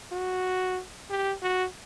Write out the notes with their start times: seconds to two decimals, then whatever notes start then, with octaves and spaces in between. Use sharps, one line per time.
0.12 F#4
1.10 G4
1.42 F#4